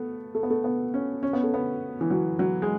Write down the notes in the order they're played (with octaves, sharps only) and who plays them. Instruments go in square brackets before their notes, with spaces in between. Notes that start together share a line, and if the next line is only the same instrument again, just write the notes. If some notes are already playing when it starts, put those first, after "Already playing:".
Already playing: [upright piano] A3 B3
A3
B3
A3
B3
C#4
C#4
B3
A3
B3
E3
F#3
F#3
G#3